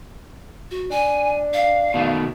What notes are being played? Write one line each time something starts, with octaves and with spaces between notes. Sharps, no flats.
F#4
D4 G#5
F5
B2 D#3 A3